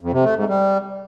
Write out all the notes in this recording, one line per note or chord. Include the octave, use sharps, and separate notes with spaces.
F2
C3
A3
G#2
G3